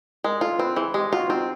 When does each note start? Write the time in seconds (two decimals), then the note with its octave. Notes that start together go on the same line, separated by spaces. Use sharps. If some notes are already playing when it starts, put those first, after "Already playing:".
0.24 G#3 A#4
0.41 F4 A4
0.59 C4 B4
0.76 E3 G#4
0.94 G#3 G4
1.13 F4 F#4
1.29 C4 D#4